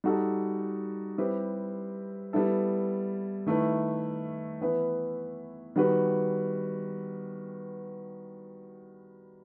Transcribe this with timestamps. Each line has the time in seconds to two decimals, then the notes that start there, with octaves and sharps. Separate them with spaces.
0.04 G3 D#4 F#4 A4
1.18 G3 C4 E4 G4 B4
2.33 G3 B3 E4 A4
3.46 D#3 A3 E4 B4
4.61 E3 B3 E4 B4
5.76 D#3 G3 B3 F#4 B4